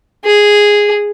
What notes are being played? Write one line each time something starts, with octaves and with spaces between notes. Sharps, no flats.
G#4